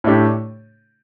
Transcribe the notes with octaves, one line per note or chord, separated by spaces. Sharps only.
A2 A3 D4 G4